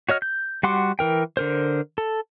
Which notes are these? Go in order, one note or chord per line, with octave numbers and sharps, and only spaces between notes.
F#4 C#5 D#5 F6
G6
G3 F#4 F#5 C6 D6
E3 A#4 G5
D3 A#4 C5
A4